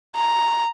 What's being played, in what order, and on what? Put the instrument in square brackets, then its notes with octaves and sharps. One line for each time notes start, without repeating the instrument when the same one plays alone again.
[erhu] A#5